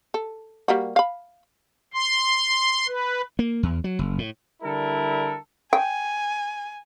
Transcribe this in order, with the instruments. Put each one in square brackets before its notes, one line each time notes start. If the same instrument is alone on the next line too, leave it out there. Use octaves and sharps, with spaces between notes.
[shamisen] A4
G3 A#3 F#4
F5 B5
[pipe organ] C6
B4
[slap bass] A#3
E2
F#3
F#1
A2
[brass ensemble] D3 G3 E4 A4 A#4
[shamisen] G5 [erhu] G#5